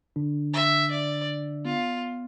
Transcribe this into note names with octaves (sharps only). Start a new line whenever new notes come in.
D3 D4
E5
D5
B3 F4